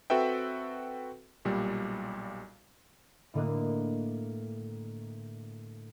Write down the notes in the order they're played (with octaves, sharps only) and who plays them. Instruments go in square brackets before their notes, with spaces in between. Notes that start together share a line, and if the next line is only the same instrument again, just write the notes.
[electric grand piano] C4 F#4 A4 B4 E5 G5
B1 A#2 G3
[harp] A2 D3 A#3 D#5 D6 F#6